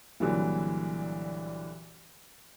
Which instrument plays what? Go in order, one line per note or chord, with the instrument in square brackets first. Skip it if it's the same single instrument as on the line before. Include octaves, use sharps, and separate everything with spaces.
[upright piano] C2 A#2 D3 E3 F#3